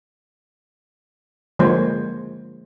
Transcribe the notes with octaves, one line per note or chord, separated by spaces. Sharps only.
D3 F3 G#3 A#3 C5 C#5